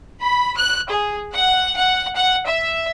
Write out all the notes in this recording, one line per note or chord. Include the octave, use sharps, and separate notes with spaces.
B5
F#6
G#4
F#5
F#5
F#5
E5